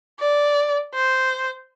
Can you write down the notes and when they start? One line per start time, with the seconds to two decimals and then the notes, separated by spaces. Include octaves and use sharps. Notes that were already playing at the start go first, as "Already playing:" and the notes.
0.20 D5
0.94 C5